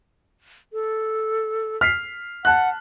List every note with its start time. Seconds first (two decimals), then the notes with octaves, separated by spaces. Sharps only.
0.73 A4
1.81 F6 B6 C7
2.45 F#5 A5 F#6